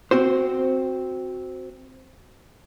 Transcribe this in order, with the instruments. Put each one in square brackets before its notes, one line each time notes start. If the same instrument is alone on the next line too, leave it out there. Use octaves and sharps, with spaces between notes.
[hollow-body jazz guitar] C4 F#4 C5